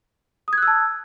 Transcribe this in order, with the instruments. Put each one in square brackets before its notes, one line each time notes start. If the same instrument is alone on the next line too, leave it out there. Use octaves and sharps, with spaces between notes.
[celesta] D#6
G#6
F#6
E6
A5